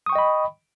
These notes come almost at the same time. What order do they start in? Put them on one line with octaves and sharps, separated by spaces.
D#6 C#6 G5 D#5 B5